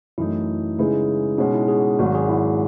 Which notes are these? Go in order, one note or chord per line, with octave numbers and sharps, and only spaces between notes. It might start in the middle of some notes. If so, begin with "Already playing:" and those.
F#2 E3 A3 D#4 E4
C#3 G#3 D#4 E4 G#4 B4
B2 G#3 C#4 D#4 F#4
E4
G#4
G#1 G#2 F#3 F#4
G#4
E4